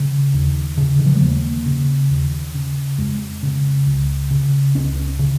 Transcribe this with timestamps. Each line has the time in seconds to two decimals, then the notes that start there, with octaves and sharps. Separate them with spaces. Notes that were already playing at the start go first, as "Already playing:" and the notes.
Already playing: C#3
0.34 D#2
0.77 C#3
0.99 D#3
1.06 F3
1.15 G#3
1.21 D#2 A#3
1.66 C#3
2.10 D#2
2.55 C#3
2.98 F2 G#3
3.43 C#3
3.87 C#2
4.31 C#3
4.75 C#2 C#4
5.19 C#3